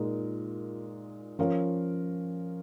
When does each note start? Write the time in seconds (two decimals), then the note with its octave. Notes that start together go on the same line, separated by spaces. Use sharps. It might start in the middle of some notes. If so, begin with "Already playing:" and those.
Already playing: A#2 G#3 D#4 A#4
1.39 F3 C#4 A#4 F5